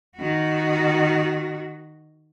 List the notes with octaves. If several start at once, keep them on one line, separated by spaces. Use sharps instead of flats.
D#3 F#4